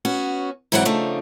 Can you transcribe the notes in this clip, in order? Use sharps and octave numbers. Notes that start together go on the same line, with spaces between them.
B3 C#4 F#4
G#2 E3 F#3 C4 A4 F#5
C#3 F3 A3 D4 D#4